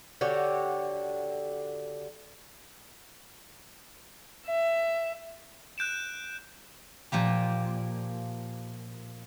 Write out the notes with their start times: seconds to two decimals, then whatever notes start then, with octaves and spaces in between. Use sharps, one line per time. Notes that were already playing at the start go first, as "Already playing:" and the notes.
0.21 D3 F#4 G4 C#5
4.45 E5
5.78 F#6 G6 D7 E7
7.12 A#2 F3 A#3 G4